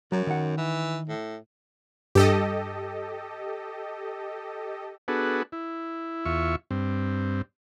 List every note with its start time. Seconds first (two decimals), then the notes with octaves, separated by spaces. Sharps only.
0.12 F#2 F#3
0.27 D#3 F#5
0.58 E3
1.09 A2
2.15 G2 G4 A4 D#5
5.08 B3 D4 F#4 G#4 A4 B4
5.52 E4
6.25 E2 F4 E5 C#6
6.71 G2 C4